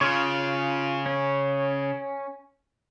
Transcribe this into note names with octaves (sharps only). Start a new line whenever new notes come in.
C#3 F4 C#5
C#4